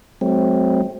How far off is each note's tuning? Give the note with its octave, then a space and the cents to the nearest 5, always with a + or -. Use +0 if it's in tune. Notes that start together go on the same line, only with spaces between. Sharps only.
F#3 +0 A3 -45 C4 +0